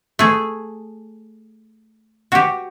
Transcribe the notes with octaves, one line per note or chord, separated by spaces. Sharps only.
A3 G#4
F#4 G4